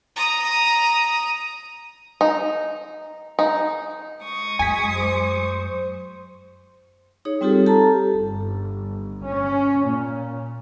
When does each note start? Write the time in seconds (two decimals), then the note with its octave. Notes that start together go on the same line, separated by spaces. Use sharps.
0.16 A#5 D#6
2.21 D#4
3.39 D#4
4.21 G#3 C#6 D#6
4.59 F#2 G#5 B6
4.95 C5
7.25 D#4 G#4 C#5
7.41 G3 C4 D#4 F4 G4 A4
7.66 G4 A4 A5 A#5
8.15 G1
9.23 C#4
9.84 A#2